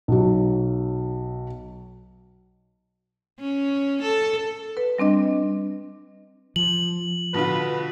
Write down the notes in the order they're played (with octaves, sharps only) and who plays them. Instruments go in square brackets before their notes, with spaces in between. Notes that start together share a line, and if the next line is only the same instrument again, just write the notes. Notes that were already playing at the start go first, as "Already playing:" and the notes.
[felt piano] B1 F#3
[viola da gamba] C#4
A4
[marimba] B4
G3 C4 D4 D#5
[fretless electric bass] F3 [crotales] F#7
[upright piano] B2 D3 F4 [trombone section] B4